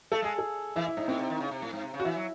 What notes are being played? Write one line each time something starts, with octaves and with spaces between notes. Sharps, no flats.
A3 A4
G#3 G#4
A4
E3 E4
E4
G#2 D#4
A2 C4
C3
D#3
C#3
C3
A2
G#2
C3
C#3
F#4
E3 E4
F#3